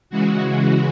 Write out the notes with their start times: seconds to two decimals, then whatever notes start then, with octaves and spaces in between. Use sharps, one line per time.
0.10 C#3 E3 G#3 F#4